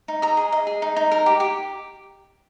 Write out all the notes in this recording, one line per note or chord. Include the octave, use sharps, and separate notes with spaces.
D#4
D#5 A#5
G#4
D#5
G#4
D#4
D#4
A#4
G4
G4